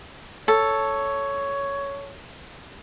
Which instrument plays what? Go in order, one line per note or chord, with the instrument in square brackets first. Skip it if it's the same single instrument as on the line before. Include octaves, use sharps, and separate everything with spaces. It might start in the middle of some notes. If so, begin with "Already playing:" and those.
[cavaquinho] A4 [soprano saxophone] C#5